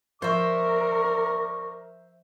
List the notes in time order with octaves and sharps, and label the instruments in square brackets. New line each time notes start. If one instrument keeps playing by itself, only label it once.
[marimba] F3 [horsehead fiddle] A#4 [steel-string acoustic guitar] C5 E5 [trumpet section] D5 C#6